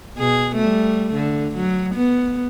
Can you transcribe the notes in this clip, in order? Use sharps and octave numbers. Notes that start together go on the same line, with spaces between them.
B2 G#4
G3 A3
D3
F#3
B3